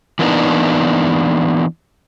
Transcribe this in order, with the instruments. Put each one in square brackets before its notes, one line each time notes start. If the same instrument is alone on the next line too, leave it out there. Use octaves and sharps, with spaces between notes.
[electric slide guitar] E3 A#3 B3 D4 D#4